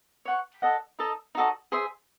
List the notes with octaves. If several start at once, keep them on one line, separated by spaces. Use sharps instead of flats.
C#5 F#5 C#6
A4 D#5 F#5
D#4 A4 D#5 A5
D#4 F#4 A4 D#5
G#4 C5 E5 C6